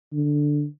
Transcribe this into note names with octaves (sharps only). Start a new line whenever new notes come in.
D3